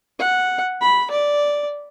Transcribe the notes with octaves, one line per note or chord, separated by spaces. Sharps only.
F#5
B5
D5